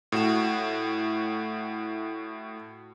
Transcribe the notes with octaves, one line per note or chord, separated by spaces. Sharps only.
A2 F#4 E7